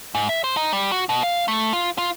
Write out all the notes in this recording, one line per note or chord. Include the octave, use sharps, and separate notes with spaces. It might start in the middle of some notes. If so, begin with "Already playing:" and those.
G#2
E5
C5
D#4
G3
F#4
B2
F5
A3
F4
F4